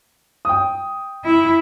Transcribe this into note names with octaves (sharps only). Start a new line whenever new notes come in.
G5 D#6
E4